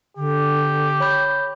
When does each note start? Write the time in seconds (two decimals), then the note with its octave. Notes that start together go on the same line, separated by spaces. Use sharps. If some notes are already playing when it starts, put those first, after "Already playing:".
0.17 D3 G4
1.00 C#5 B5 G6